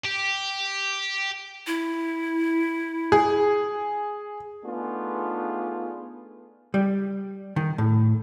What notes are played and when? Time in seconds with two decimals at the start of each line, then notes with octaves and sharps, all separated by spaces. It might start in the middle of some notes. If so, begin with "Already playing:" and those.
0.05 G4
1.67 E4
3.12 G#4
4.64 A3 B3 D4 D#4 F4 G#4
6.74 G3
7.56 D#3
7.78 A2